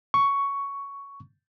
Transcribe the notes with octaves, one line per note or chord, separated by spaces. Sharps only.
C#6